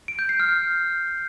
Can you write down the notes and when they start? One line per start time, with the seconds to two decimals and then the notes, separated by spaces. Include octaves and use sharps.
0.08 D7
0.19 G6
0.29 C7
0.40 F6